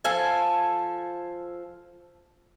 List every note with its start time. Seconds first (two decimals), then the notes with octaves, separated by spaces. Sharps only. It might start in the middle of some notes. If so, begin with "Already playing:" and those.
0.04 F3 A4 G#5